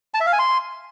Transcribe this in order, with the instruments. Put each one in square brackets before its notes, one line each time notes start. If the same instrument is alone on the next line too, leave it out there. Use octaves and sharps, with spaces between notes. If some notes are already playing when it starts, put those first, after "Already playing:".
[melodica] A5
E5
F5
G#5
C6